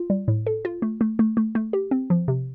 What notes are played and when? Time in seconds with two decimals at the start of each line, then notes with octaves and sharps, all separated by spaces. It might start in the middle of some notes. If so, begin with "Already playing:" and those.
Already playing: F4
0.10 G3
0.28 A2
0.47 A4
0.65 F4
0.82 A3
1.01 A3
1.19 A3
1.37 A3
1.55 A3
1.73 G4
1.91 C4
2.10 F3
2.28 C3